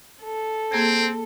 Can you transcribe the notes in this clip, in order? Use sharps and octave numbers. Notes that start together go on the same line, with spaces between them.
A4
A#3 C4 G#4 G#6